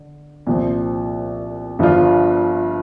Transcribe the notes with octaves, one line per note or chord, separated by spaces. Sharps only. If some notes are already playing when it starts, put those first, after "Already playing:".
Already playing: D3
C2 A#2 F3
G1 G2 F3 D4 F4